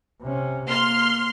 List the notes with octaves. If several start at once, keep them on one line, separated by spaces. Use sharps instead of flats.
C3 C#4
A#3 C6 F6